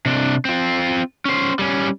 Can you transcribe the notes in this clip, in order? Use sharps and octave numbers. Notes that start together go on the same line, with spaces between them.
C3 D4
C4 F4
C#4 C5
G3 C#4